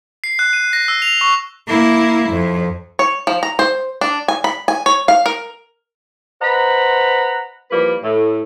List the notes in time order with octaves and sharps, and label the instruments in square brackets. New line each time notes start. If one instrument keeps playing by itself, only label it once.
[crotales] C7
F#6
D#7
A#6
E6
F7
C#6
[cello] A#3 E4
F2
[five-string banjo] C#5
F3
A#5
C5
D4
G#5
B5
G#5
C#5
F5
A#4
[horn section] B4 C5 D#5 F#5 A#5 B5
E3 F3 G3 A#3 B4
A2